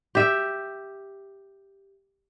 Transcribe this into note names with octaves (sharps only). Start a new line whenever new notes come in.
G4 E5